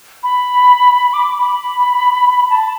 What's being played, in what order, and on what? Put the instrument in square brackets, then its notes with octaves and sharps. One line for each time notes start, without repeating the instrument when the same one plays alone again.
[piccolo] B5
D6
B5
A5